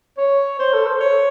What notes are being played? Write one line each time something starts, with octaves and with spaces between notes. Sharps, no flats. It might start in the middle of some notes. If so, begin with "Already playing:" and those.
C#5
C5
A4
C5
C#5